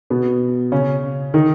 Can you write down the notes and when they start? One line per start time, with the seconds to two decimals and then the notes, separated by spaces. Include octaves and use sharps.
0.10 B2 B3
0.72 C#3 C#4
1.34 D#3 D#4